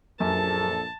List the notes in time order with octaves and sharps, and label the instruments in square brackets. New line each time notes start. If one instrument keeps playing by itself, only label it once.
[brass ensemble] A#1 [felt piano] F#2 [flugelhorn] A4 [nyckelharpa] A5